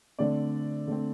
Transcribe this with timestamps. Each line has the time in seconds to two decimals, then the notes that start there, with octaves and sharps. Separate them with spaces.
0.19 D3 A3 C4 D5
0.87 D3 A3 C4